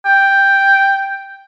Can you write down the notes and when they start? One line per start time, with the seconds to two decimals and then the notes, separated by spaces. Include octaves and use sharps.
0.05 G5